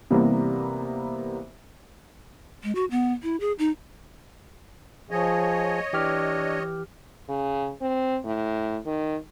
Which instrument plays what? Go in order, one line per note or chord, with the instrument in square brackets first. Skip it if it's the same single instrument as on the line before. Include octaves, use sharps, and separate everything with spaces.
[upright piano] C3 E3 G3 A#3 B3
[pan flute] G#3
F#4
B3
E4
G#4
D#4
[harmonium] F3 G#4 [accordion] C#5 D#5
[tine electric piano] E3 G4 F6 [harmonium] D4
[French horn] C#3
C4
A2
D#3